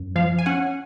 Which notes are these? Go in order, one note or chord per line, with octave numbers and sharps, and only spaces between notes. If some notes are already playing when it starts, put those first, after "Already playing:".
Already playing: F#2
F3 F5
G#5
C#4 F#5